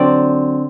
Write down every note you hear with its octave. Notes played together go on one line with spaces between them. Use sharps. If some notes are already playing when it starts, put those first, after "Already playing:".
Already playing: D3 F#3 C4 D5